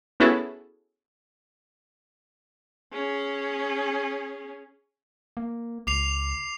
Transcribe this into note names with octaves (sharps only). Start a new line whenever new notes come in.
B3 C#4 E4 F#4 G#4 A4
C#4 G#4
A#3
C#2 D6 C7 F7